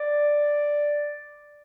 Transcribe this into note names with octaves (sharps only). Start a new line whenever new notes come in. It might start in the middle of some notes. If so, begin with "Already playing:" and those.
Already playing: D5